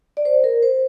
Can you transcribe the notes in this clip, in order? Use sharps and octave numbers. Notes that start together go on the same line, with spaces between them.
D5
C5
A#4
C5